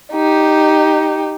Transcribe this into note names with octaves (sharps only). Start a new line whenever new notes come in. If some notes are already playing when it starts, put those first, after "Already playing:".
D#4 G4